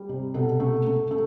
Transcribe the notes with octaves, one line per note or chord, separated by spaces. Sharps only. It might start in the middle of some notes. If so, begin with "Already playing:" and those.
Already playing: G3
C3
B2 A4
A3
A3
A3